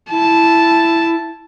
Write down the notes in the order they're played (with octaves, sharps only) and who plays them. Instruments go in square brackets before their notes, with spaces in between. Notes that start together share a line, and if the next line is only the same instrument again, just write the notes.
[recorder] E4 [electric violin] A5